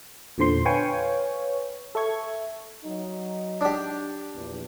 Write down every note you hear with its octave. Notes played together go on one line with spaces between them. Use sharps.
E2 A#2 D3 C5 C6
B4 C#5 F5 G5 G#5 C#6
A4 E5 C#6 G#6
F#3 D#4
D4 G4
A#1 E2